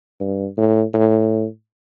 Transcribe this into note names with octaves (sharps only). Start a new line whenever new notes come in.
G2
A2
A2